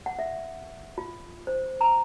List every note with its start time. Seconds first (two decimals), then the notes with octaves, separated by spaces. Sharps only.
0.06 F#5
0.19 E5
0.98 F4
1.47 C5
1.81 A#5